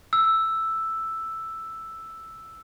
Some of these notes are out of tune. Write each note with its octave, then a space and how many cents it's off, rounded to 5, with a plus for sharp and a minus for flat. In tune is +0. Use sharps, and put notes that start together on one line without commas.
E6 +0